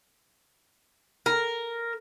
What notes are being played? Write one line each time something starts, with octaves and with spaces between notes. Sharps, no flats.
A#4